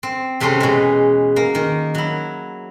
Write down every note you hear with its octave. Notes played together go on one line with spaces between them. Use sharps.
C4
E2 C3 A3 C4 C#4 C5
B2 G#3
A#3
D#3
F#3 E4